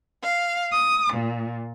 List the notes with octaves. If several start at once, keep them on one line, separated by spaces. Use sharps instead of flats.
F5
D#6
A#2